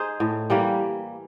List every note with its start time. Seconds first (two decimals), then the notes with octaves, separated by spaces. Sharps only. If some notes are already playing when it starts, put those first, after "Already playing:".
Already playing: D#4 G#4 C5
0.20 A2
0.50 E3 G3 A#3